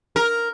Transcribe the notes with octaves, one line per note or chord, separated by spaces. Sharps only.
A#4